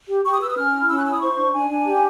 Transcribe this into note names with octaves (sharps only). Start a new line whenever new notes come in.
G4
G4 C#6
D#6
B4 E6
D#6
C#4 F6
E4
C#4 E6
F#6
E4 E6
D#6
C5 C#6
D4
D4 G#5
D4
G4